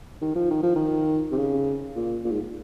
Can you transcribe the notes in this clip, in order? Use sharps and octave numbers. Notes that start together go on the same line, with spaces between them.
D#3
F3
D#3
F3
D#3
C3
C#3
A#2
A#2
G#2